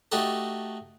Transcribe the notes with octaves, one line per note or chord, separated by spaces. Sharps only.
A3 D#4 F#4 G4 A4